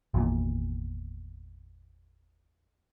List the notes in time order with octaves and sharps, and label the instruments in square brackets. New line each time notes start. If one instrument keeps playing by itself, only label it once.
[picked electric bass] G#1 E2 A#2